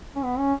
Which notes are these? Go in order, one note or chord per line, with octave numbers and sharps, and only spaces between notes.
C#4
B3
C#4